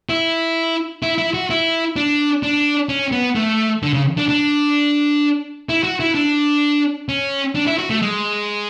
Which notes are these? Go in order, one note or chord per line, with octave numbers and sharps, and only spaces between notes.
E4
E4
E4
F#4
E4
D4
D4
C#4
B3
A3
D3
C#3
D4
D4
E4
F#4
E4
D4
C#4
D4
E4
F#4
A3
G#3